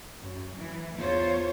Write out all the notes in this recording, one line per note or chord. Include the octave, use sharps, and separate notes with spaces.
F#2
E3
E2 F4 C5 C#5